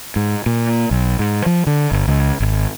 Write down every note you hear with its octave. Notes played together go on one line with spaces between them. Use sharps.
G#2
A#2
B1
G#2
F3
D3
G1
C#2
G#1